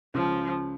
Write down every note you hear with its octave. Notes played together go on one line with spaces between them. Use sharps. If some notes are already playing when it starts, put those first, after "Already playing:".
C#2 C#3 F3